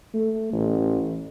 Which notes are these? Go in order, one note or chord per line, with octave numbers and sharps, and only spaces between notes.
A3
A1